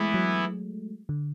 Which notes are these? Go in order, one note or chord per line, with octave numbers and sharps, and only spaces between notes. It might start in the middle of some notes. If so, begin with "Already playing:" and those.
Already playing: E3 G#3 A3 B3 E4
F#3
D3